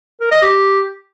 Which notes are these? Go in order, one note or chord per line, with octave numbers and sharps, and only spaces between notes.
A#4
D#5
G4